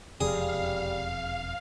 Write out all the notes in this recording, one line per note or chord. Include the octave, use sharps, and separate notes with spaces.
E1 F2 C3 G3 G#4 F5